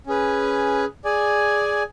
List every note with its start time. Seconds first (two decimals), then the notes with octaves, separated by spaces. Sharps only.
0.07 C#4 G#4 B4
1.04 G#4 D5 G#5